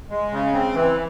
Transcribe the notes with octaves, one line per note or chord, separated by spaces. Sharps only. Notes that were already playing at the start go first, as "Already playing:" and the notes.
G#3
C#3
C4
E3